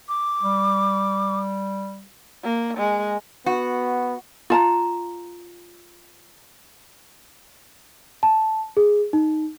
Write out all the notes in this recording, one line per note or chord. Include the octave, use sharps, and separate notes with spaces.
D6
G3
A#3
G#3
B3 F#4
F4 A5 A#5
A5
G#4
D#4